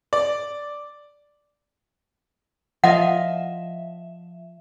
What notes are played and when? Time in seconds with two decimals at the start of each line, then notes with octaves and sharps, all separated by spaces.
0.13 D5
2.84 F3 F4 D#5 E5 F#5